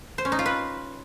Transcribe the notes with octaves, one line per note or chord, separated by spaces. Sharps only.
C5
C#4
D#4
F4
B4